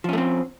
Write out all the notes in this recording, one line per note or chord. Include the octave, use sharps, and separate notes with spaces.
F3 A3 C4 C#4